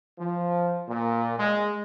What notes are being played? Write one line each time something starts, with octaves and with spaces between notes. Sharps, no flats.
F3
A#2
G#3